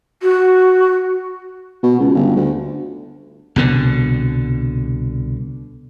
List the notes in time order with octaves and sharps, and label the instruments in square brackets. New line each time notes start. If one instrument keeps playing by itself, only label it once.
[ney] F#4
[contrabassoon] B2
C#2
G1
D2
[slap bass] C2 B2 D3